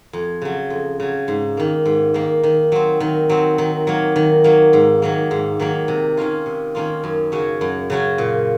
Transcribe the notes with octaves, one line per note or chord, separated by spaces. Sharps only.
F2
C#3 F#3
F2
C#3 F#3
G#2
D#3 A#3
G#2
D#3 A#3
D#3
F#3 C4
D#3
F#3 C4
D#3
F#3 A#3
D#3
F#3 A#3
G#2
D#3 F#3 A#3
G#2
D#3 F#3 A#3
C3
D#3 A#3 C#4 F4
C3
D#3 A#3 C#4 F4
F#2
C#3 F#3 C#4 F#4
F#2
C#3 F#3 C#4 F#4
A#2